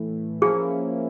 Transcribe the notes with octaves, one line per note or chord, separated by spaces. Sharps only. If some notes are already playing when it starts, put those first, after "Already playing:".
Already playing: A2 E3 A3
F3 A#3 C#4 E4 G#4